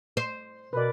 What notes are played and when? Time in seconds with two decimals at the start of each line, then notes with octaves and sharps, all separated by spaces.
0.17 C5
0.73 B2 A#4 B4 D5